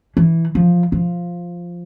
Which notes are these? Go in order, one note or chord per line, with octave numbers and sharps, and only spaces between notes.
E3
F3
F3